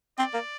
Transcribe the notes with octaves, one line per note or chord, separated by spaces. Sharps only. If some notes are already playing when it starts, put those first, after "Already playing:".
C4 D5
A#3